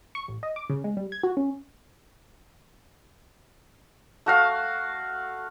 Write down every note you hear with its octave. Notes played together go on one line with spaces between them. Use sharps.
C#6
A1
D#5
D6
C#3
G#3
G3
G#6
F#4
C#4
A3 F#4 F5